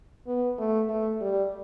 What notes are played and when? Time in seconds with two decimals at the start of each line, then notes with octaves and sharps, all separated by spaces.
0.27 B3
0.58 A3
0.89 A3
1.21 G3